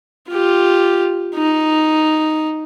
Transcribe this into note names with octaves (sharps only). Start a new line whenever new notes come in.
F4 G4
D#4